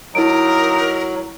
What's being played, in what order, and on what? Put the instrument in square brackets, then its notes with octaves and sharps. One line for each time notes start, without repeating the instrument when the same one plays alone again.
[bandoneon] F#3 [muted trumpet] D#4 [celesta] E4 D7 [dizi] A#4